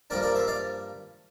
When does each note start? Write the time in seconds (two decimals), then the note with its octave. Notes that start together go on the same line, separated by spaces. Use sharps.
0.10 G2 F3 A#3 D4 A#4 D5
0.22 A#4 D5
0.35 C5 E5
0.47 D5 F5